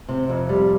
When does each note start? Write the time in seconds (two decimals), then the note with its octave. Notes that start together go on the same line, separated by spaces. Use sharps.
0.09 C3
0.29 F2
0.49 G3